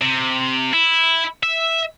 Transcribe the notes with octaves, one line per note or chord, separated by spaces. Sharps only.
C3
E4
E5